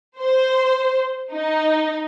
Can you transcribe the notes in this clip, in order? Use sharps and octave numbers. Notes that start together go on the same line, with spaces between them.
C5
D#4